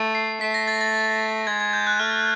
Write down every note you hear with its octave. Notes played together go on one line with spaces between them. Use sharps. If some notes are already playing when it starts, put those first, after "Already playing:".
Already playing: A3
C7
A3 B6
A#6
A6
A6
G#3 G#6
G#6
G6
F#6
A3 F6